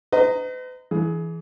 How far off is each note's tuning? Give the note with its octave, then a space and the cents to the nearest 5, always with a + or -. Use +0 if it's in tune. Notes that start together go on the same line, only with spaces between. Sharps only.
B4 +45 D#5 +0 A#5 -15
E3 +0 G#4 +20